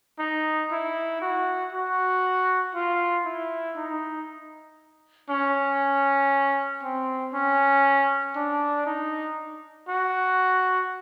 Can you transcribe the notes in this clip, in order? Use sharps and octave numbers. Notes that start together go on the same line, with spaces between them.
D#4
E4
F#4
F#4
F4
E4
D#4
C#4
C4
C#4
D4
D#4
F#4